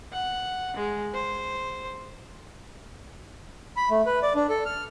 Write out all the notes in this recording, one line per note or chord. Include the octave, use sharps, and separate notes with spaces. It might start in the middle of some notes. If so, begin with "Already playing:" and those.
F#5
G#3
C5
B5
A3
B4
D5
D4
A4
F6